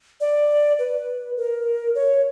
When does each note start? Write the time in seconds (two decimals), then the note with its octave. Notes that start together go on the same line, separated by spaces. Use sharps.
0.20 D5
0.79 B4
1.37 A#4
1.95 C#5